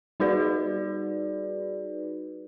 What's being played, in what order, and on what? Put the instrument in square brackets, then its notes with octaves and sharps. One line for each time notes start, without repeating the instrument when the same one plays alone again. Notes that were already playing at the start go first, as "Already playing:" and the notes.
[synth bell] G3 D#4 F#4 G#4 B4 D5